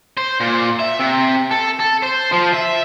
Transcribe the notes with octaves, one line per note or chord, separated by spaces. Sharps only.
C5
A#2
E5
C3
A4
A4
C5
F3
E5